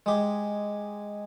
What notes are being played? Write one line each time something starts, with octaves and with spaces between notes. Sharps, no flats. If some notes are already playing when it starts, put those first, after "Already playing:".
G#3 G4